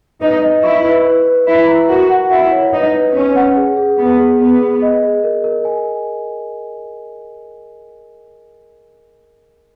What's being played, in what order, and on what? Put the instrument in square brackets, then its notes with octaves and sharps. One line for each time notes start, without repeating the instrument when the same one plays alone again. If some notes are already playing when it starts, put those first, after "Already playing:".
[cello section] D#4 [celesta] B4
[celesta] D#5
[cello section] E4 [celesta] C#6
[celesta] B4
B4
B4
[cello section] E4 [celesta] B4
[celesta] A#5
[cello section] F#4 [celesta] A#4
[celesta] F#5
[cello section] E4 [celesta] F#5
[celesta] C#5
[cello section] D#4 [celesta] B4
[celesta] B4
[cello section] C#4 [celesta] B4
[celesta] F#5
G#4
G#4
[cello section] B3 [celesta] G#4
[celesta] G#4
[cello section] B3 [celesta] G#4
[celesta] G#4
D#5
G#4
A#4
A#4
G#5